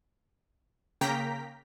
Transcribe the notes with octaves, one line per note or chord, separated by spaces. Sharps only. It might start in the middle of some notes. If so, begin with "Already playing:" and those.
C#3 A#3 G5 A#5 B6